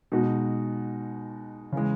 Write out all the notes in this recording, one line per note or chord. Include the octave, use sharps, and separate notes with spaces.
B2 G#3 D#4 F#4
C#3 E3 G#3